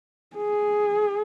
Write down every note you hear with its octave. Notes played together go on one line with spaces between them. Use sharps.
G#4